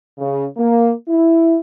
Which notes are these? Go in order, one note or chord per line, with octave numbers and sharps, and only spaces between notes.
C#3
A#3
E4